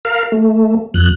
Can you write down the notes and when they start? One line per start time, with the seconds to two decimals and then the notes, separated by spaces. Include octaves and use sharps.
0.05 A#4 F5
0.32 A3
0.94 F2 F#6